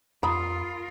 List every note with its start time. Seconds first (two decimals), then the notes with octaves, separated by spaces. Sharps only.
0.23 F2 F4 A#4 A#5 B5 D#6